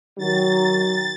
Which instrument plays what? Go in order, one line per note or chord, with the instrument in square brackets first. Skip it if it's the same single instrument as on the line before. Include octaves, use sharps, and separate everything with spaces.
[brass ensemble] D#3 F#3 [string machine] A6